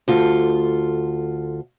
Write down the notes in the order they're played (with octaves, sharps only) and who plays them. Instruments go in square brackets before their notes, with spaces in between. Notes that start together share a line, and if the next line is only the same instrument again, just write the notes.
[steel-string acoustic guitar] D2 F4 A4